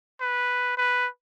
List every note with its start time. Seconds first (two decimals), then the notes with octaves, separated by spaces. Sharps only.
0.21 B4
0.77 B4